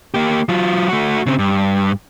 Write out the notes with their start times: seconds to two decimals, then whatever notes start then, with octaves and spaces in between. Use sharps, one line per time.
0.14 A#3 G4
0.49 F#3 F4
0.89 A3 F#4
1.26 C#3 C4
1.39 G2